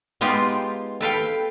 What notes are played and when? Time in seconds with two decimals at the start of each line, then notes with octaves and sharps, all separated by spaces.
0.21 G#3 B3 D#4 F4 G4
1.01 A4 B4 F5 G5